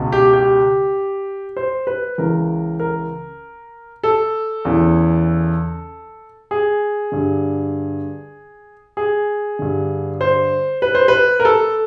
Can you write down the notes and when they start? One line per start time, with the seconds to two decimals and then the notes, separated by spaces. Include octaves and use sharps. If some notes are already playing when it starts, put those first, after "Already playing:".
Already playing: C#2 B2
0.12 G4
0.33 G4
1.57 C5
1.87 B4
2.18 C#2 C#3 E3 A#4
2.80 A#4
4.03 A4
4.65 E2 C#3 E3
6.51 G#4
7.12 G2 D3
8.97 G#4
9.59 G2 D3
10.21 C5
10.82 B4
10.95 C5
11.08 B4
11.40 A#4
11.45 A4